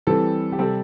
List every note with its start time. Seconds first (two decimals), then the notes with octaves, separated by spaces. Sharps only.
0.07 E3 G3 C4 A4
0.52 G4
0.59 C3 G3 C4 A4